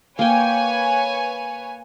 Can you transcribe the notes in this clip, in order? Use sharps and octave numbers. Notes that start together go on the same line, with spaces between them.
A#3 B4 C#5 G5 G#5